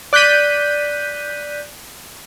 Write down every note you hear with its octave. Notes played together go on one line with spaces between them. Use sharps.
D5 F#6 G6 B6 D#7